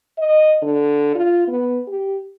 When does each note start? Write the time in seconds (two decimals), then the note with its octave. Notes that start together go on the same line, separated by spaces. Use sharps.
0.18 D#5
0.62 D3
1.15 F4
1.48 B3
1.87 G4